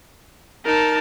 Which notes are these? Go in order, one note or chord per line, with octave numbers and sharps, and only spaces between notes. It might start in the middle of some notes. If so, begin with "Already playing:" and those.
D#4 A#4 A5